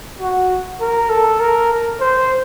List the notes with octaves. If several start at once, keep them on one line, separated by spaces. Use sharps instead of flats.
F#4
A#4
A4
A#4
C5